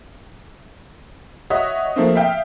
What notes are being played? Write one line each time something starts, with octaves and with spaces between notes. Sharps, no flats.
F#4 C#5 D#5 E5 D#6
F3 A3 A#3 C4
E5 F5 G5